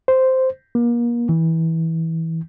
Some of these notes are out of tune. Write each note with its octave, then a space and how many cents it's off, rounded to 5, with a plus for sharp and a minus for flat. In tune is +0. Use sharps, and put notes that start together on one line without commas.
C5 -5
A#3 +35
E3 -20